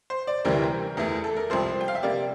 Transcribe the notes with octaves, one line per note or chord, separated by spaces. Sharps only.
C5
D5
D2 C3 E3 G3 C4 A#4
E2 E3 A3
A4
A#4
C2 C3 F3 C5
G5
F5
E5
C3 G3 A#3 D5